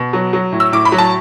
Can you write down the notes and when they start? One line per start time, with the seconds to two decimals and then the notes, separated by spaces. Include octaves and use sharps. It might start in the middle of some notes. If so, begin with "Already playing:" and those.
Already playing: B2
0.13 F#3
0.33 F#3
0.52 A2
0.60 E6
0.72 A2 D6
0.85 B5
0.92 F#3
0.98 A5